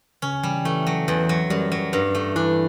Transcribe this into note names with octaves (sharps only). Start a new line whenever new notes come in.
C#3 C#4
E3 G3
E3 A3
F#3
E2
F#3
F#2 G3
F#3
G2
A3
E3 D4